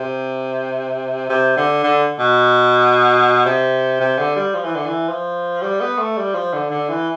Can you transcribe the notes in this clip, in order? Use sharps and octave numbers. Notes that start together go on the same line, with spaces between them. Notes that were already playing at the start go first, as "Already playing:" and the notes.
Already playing: C3
C3
D3
D3
B2
C3
C3
D3
G3
F3
E3
D3
E3
F3
G3
B3
A3
G3
F3
D3
D3
E3